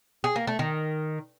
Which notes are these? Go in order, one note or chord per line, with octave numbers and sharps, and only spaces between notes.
G#4
A#3
A3
D#3